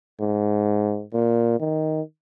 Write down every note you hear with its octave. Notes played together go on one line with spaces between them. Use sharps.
G#2
A#2
D#3